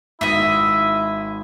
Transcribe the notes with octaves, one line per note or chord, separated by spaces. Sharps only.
G#1 E4 D#5 E5